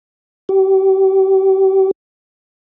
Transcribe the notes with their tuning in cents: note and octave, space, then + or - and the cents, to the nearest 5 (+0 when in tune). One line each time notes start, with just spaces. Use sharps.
G4 -35